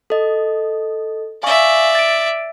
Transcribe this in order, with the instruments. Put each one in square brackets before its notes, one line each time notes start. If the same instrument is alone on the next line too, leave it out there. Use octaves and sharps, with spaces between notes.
[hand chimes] A4 D#5
[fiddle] D5 E5 [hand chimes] F5 G#5 C#6
[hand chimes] A6 D7